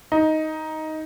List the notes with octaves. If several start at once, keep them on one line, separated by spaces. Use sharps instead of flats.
D#4